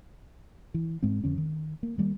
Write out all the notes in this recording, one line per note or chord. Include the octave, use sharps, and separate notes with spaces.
E3
G#2 G#3 C4
F2 D3 C#4
D#3
A#3
D#3 G3 A#3